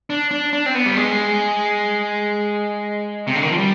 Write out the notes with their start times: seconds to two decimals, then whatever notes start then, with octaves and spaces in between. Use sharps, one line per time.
0.10 D4
0.31 D4
0.53 D4
0.66 C4
0.75 B3
0.86 G3
0.97 G#3
3.27 C3
3.35 D3
3.43 D#3
3.50 F3
3.58 G3